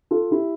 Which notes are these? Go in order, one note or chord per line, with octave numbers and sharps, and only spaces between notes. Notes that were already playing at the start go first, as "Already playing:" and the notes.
F4 A4
E4 G4